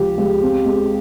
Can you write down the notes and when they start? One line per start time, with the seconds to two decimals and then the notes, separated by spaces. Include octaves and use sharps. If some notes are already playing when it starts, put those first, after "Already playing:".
Already playing: C#2 F3 G4
0.18 C#2
0.41 C4
0.66 G#3